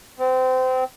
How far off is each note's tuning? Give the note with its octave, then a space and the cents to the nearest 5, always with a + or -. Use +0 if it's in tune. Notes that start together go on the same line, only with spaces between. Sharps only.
C4 -25